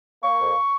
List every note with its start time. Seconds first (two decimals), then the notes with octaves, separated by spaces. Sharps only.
0.22 A#3 C#6
0.39 F2